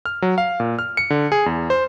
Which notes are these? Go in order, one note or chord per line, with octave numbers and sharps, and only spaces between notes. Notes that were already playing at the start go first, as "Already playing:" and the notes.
F6
F#3
F5
A#2
F6
C#7
D3
G#4
E2
C5